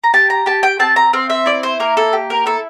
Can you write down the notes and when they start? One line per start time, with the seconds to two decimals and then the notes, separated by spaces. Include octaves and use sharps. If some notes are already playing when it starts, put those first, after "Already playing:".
0.04 A#5
0.13 G4 A5
0.30 A#5
0.46 G4 A5
0.63 G5
0.80 C4 A5
0.96 A#5
1.13 C4 F5
1.30 E5
1.46 E4 D5
1.63 C5
1.80 A#3 A#4
1.97 A4
2.13 G4
2.30 A#4
2.46 E4 A4